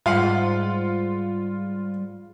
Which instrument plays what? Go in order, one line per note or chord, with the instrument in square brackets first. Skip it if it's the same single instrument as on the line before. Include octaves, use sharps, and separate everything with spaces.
[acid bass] G#2 [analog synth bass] G3 [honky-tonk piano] F4 [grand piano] F5 F#5